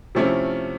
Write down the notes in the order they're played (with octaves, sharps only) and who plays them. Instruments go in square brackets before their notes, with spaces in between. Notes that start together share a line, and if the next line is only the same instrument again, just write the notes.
[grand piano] C3 F3 A3 C#4 E4